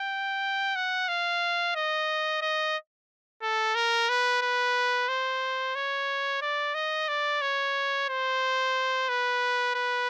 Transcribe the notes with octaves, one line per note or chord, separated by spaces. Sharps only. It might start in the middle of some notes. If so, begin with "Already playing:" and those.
Already playing: G5
F#5
F5
D#5
D#5
A4
A#4
B4
B4
C5
C#5
D5
D#5
D5
C#5
C5
B4
B4